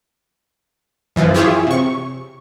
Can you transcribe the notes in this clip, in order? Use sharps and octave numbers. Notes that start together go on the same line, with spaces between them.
F#2 E3 F3
E4 F4 G4 G#4 C#5 E5
C3 C#6